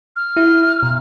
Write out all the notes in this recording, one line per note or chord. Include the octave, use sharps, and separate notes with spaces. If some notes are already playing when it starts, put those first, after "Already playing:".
F6
E4
B2